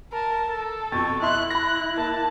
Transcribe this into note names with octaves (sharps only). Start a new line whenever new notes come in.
A#4 A5
A4
F2 B2 C#6 A6
E4 D#5 E5 C6 F#6
B5 F#6 A#6
A#3 A5